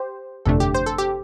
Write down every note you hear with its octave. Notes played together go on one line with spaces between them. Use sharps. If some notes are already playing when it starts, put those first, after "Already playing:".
Already playing: G4 C5
G1 F2 C3 A3 D4 A4
G4
C5
A4
G4